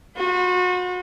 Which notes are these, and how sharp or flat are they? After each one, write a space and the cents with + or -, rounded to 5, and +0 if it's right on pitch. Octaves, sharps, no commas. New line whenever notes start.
F#4 -35 C5 -40